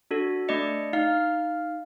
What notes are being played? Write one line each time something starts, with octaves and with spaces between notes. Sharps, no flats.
D4 F#4 A4
A3 D4 D5 D#5 C#7
D#4 F5 F6